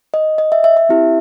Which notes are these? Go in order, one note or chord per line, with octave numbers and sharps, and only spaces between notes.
D#5
D#5
E5
E5
E5
C4 E4 G4